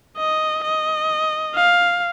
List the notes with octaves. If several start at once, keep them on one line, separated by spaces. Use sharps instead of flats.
D#5
D#5
F5